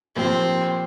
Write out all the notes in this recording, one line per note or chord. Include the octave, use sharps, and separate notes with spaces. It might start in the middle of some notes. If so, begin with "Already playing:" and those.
A#2 F3 A#3 C4 G4